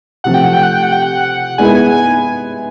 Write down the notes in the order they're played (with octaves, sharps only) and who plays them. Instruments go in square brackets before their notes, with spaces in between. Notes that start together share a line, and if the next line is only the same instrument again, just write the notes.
[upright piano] C3 F3 A3 [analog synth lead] F#5
[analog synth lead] G5
F#5
G5
F#5
G5
F#5
G5
F#5
[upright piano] G#3 B3 E4 G#4 B4 [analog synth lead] G#5
[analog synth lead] G#5
G#5